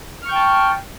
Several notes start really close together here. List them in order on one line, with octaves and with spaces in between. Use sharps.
F6 C#6 G6 G5 A5